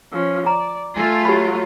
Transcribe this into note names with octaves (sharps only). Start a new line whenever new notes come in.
F3 C#4
D5 A#5
A3 F4 A4 G#5
F#3 G4 B5